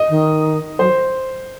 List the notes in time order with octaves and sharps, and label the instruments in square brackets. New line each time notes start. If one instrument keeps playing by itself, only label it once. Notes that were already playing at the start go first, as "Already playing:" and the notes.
Already playing: [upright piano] D#5
[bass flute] D#3
[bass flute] F#3 [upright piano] C5